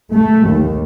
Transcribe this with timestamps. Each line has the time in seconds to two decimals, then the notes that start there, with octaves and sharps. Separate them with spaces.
0.13 A3
0.48 D#2